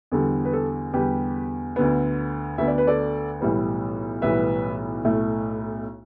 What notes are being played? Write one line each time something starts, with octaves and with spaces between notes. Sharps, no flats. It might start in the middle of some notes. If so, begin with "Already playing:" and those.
E2 D3 G3 A4
B4
A4
E2 D3 G3 G4 B4
D2 D3 B3
D2 D3 B3 E5
D5
B4
A4 D5
B1 A2 E3 G3 B3
B1 A2 E3 G3 B3 B4 E5
B1 A2 A3